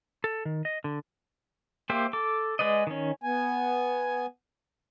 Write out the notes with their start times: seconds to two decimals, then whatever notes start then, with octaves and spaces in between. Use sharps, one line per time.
0.24 A4
0.45 D#3
0.65 D#5
0.84 D3
1.90 A#3 G4 C5 E5
2.13 A4 D6
2.59 G#3 B4 D5 D#5
2.87 D#3 C#4
3.23 B3 G#5